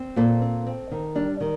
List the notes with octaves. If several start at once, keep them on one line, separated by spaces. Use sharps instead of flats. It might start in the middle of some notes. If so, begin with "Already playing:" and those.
Already playing: C4
A#2 A4 C5
C4
C4
D#3
G3 D4
D#3